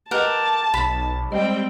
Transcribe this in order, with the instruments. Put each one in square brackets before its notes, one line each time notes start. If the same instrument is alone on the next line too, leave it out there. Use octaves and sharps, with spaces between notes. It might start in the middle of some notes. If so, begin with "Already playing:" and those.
[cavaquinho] G4 A#4 F#5 [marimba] B4 D#5 [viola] A5
[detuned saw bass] B1 [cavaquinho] B5
[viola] G3 G5 [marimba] G#3 D#5 [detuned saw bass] C4